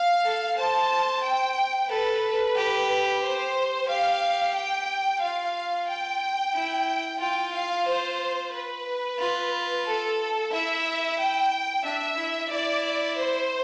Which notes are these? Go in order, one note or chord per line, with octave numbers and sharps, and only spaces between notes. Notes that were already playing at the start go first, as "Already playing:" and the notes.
Already playing: F5
A4
C5 A5
G5
A4 B4
G4
C5
G4 F5
G5
F4 F5
G5
E4
F4 G5
F5
C5
B4
F4
A4
E4 E5
G5
D4 E5
E4
E4 D5
C5